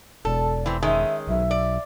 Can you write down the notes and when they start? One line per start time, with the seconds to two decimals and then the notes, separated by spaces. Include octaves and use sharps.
0.25 E1 A4 D5
0.66 E3 C4
0.83 D#3 G#3 C#4 E5
1.28 B1 E5
1.51 D5